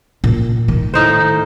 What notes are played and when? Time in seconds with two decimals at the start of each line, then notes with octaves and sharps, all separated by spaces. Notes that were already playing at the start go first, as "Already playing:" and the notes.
0.24 A#2
0.68 D#3
0.94 A2 D#4 C5